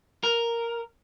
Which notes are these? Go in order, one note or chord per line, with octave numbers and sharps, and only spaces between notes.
A#4